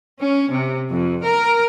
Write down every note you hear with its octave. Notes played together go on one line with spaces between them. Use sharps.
C#4
C3
F2
A#4